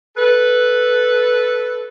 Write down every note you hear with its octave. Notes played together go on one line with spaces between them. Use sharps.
A4 B4